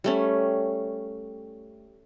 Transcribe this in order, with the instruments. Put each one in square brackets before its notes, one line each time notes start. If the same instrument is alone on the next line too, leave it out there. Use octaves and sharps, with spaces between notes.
[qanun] G3 A3 C#4